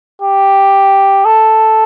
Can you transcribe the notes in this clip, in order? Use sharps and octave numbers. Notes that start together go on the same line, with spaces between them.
G4
A4